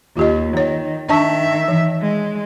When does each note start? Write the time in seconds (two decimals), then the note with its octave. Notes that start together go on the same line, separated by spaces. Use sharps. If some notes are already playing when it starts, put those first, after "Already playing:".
0.17 D#2 F4 G4 D#5
0.57 D#3 C#5
1.09 D#3 D4 E5 A5 C#6
1.68 E3
2.01 G#3